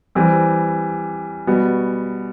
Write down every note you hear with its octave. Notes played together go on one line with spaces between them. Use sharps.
E3 G3 C4 G4
B2 G3 B3 F#4